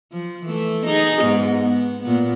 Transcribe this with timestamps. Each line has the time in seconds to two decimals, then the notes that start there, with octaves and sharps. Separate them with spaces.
0.12 F3
0.46 E3 A3
0.87 D#4 G#4
1.22 G#2 B3
1.62 B3
2.02 A#2 B3